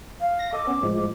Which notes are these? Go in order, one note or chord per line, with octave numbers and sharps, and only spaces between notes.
F5
A#6
A4 D#5 D6
B3 C#4
A2 F3 G#3